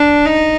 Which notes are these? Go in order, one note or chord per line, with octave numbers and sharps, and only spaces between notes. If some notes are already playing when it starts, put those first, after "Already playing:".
Already playing: D4
D#4